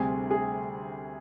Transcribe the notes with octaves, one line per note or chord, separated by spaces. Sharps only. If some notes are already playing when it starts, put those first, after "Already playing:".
Already playing: D2 C3 G3 C4 G#4
G#4